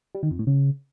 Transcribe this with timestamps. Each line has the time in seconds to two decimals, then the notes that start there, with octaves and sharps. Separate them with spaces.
0.15 G3
0.23 D#3
0.31 F2
0.39 A2
0.47 C#3